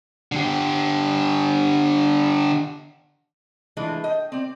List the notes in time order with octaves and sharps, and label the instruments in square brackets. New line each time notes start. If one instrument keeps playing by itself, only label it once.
[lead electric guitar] D3 G4
[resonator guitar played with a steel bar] E3 G#3 A3 D4 F4
D#5 G5
C4 D5